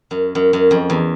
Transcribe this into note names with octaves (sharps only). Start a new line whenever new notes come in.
F#2
F#2
F#2
F2
E2